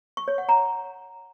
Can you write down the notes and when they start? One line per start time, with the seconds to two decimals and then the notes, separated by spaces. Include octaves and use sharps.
0.17 C#6
0.28 C#5
0.38 F#5
0.49 A#5